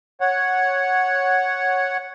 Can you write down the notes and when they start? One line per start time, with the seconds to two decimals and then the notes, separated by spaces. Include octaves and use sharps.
0.21 C#5 F#5